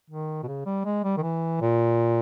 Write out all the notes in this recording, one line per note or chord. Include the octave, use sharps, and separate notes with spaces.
D#3
B2
C#3
G3
G#3
G3
D#3
E3
A#2